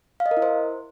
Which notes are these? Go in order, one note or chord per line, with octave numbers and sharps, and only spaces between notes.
F5
D#5
A#4
E4
C5